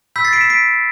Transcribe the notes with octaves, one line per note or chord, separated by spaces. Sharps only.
B5 E6 G6 B6
A6 C7
B6 D7
C7 E7
B6 D7